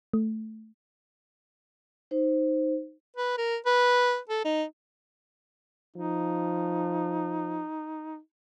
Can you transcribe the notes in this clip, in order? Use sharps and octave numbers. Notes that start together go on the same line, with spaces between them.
A3
D#4 C5
B4
A#4
B4
A4
D#4
F3 D#4